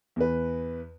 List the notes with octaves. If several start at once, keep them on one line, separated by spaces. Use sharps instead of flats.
E2 B4